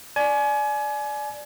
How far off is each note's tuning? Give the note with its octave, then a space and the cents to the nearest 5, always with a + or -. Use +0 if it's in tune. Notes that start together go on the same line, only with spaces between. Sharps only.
D5 +0 G#5 +30